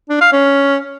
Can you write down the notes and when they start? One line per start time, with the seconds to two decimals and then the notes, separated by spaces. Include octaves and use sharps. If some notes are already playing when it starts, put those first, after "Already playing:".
0.09 D4
0.21 F5
0.32 C#4